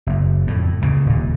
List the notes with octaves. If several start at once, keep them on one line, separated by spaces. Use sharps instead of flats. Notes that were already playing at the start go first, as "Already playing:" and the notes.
F#1 F#2
F2 A2
C#2 A#2 C#3
D#1 A#2